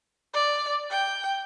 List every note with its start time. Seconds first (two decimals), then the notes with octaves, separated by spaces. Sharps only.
0.34 D5
0.91 G5